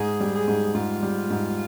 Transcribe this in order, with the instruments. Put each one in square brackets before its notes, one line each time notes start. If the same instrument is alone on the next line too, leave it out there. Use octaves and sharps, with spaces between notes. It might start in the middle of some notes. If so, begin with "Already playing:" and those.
Already playing: [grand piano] G#2 [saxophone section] G#4
[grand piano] G3
[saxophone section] G#4
[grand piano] G#2
[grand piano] G#2 [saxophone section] F4
[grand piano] G3
G#2